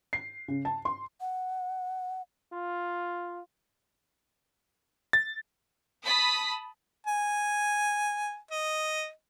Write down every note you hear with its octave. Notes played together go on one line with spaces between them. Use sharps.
C7
C#3
A5
C6
F#5
F4
A6
A5 B5 D#6 B6
G#5
D#5